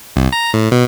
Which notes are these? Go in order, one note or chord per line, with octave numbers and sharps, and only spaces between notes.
C2
A#5
A2
B2